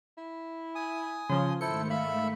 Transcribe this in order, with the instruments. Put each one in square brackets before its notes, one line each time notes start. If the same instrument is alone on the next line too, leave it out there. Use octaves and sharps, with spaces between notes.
[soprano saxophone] E4
[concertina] G#5 D#6
[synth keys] C#3 F3 [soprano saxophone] C6
[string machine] G#2 D#3 A3 [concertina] E4 A4 [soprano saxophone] C5 [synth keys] C#7
[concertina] E5 B5 [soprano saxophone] F5